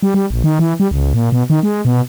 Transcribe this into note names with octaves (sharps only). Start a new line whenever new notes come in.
G3
G3
A#1
D#3
E3
G3
C#2
A#2
B2
D#3
G#3
B2